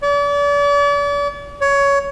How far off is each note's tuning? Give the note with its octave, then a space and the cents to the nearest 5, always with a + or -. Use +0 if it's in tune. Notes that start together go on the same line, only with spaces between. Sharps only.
D5 -40
C#5 +15